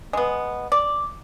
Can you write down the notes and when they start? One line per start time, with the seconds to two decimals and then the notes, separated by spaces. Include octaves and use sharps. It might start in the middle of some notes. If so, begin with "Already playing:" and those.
0.13 G#3 B3
0.72 D5